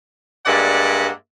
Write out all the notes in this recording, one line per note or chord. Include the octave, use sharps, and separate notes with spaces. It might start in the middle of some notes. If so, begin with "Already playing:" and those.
G2 G#3 A#3 D5 E5 F#5